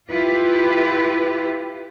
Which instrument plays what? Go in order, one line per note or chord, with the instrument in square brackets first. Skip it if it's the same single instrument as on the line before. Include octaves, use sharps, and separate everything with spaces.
[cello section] E4 F4 G4 B4